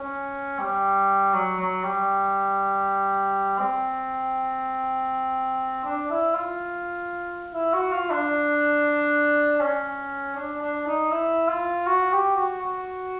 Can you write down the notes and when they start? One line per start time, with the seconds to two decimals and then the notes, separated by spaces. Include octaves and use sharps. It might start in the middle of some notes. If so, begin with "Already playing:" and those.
Already playing: C#4
0.59 G3
1.34 F#3
1.59 F#3
1.83 G3
3.59 C4
5.84 D4
6.10 E4
6.34 F4
7.54 E4
7.73 F#4
7.92 F4
8.10 D4
9.61 C#4
10.35 D4
10.61 D4
10.86 D#4
11.11 E4
11.48 F4
11.86 F#4
12.12 G4
12.36 F#4
12.61 F#4